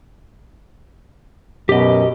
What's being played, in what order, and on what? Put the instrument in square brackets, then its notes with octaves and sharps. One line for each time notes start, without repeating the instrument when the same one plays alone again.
[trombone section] F#2 B2 [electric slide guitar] G4 D#5